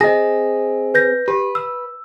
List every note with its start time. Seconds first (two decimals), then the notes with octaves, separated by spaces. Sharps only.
0.01 C4 G#4 D#5 A#6
0.94 B4 G6 A#6
1.28 G4 B4
1.55 E6